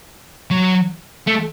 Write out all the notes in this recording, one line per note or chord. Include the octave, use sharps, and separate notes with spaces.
F#3
A3